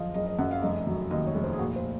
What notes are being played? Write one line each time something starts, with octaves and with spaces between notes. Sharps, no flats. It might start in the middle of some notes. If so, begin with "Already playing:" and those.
Already playing: F#1 F3 D#5 F5
F#1 D#5
D#5
F#2 F#5
F5
F1 D#5
F#3
D#2 D#5
C#5
F1
C5
G#4
A#2 F#4
C5